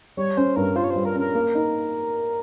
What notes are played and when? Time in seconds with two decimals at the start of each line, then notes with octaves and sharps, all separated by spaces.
0.17 G3 C#5
0.37 C#4 C5
0.56 G2 A#4
0.76 F4 C5
0.84 C#5
0.90 C5
0.96 G3
1.05 A#4
1.15 C#4 A#4
1.35 A#3
1.55 D#4